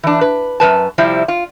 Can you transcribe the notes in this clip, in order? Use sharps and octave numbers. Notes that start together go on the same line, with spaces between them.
E3 D4
B4
F#2 E3 B4 A5
C3 F3 G3 C4 E4
F4